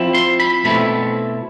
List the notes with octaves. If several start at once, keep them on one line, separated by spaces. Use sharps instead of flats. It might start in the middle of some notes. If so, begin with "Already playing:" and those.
Already playing: F3 C4 E4
C6
B5
B2 A3 C4 E4 B5